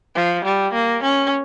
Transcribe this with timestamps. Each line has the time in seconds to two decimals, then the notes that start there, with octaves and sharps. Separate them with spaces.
0.16 F3
0.45 G3
0.74 A#3
1.03 C#4